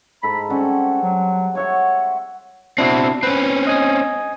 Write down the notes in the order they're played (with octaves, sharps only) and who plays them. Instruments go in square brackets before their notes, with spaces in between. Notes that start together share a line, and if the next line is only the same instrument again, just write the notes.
[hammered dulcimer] G#2 A4 A#5 [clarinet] B5
[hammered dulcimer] G3 C4 F#4 [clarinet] C#4
[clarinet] F#3
[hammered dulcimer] F#4 E5 F#5 [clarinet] C#5
[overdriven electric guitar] B2 C4 [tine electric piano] D4 E4 F#4
[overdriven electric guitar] C4 C#4 [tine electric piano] B4
[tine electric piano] D#5 G#5 D#6